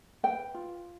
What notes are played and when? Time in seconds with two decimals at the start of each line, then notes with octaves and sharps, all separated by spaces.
0.23 B4 G5
0.54 F4